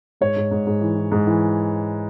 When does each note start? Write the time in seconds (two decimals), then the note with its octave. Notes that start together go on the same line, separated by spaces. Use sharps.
0.21 G#2 C#5
0.36 G#2
0.51 G#2
0.67 G#2
0.81 E3
0.97 E3
1.12 G#2
1.27 E3